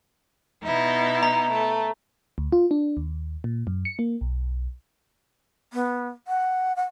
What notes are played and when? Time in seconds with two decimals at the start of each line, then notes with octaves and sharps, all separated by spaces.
0.63 B2 D#4 E4
1.23 A#5
1.51 A3
2.38 D2
2.52 F4
2.71 D4
2.97 D#2
3.44 A#2
3.67 F#2
3.85 C#7
3.99 A#3
4.21 B1
5.73 B3
6.28 F#5
6.76 F#5